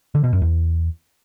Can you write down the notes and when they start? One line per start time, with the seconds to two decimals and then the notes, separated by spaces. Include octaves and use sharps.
0.15 D3
0.24 B2
0.33 F#2
0.42 E2